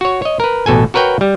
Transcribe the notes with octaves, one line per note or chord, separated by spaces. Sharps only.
F#4 C#5
C#5 D#5
A#4 B4
A1 B2 A4 G#5
F#4 A#4 B4 C#5 G5
G3